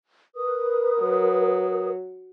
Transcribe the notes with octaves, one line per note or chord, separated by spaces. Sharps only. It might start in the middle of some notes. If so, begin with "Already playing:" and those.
A#4 B4 D#6
F#3